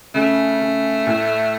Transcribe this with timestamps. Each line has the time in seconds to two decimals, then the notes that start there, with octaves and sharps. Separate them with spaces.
0.14 C#3 A3
0.60 C#3
1.06 A2